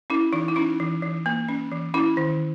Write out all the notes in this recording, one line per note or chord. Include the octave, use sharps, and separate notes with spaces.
C#4 E4
E3 D#4
E4
C#4 D#4
E3
E3
A#3
C#4
E3
C#4 E4
D#3